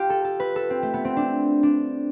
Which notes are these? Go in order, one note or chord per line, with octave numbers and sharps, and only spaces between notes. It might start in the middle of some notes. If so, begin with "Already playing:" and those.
Already playing: F4 G4
A4
A4
B4
A4
C4
A3
B3
C4
D4
D4